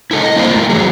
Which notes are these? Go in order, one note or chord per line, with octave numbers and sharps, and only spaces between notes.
E4 A4 D#5
D#5
G3 A#3 E4 C5 D5 D#5
A3 F4
E3 F#3 G#4